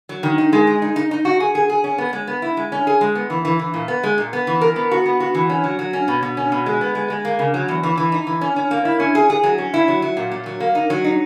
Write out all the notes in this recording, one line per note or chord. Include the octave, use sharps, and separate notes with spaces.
F#3
D#3
D#4
G#3
G#4
D#4
D#4
D#4
F#4
G#4
G#4
G#4
C#4
B3
G#3
B3
E4
G#3
C#4
G#4
G#3
B3
E3
E3
E3
A#2
B3
G#3
A#2
B3
E3
A#4
B3
F#4
B3
F#4
E3
C#4
F#3
F#3
C#4
B2
B2
C#4
B2
G#3
B3
G#3
G#3
A#3
C#3
F#3
E2
E3
E3
D#4
E3
C#4
C#4
A#3
E4
C#4
G#4
G#4
F#3
C#4
E4
F#3
F#3
A#2
A#2
F#3
A#3
D#4
F#3
D#4